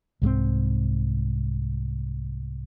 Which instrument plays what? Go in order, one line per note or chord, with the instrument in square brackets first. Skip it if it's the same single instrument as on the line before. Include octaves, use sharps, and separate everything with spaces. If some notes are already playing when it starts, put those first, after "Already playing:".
[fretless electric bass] C2 G#2 G3 C4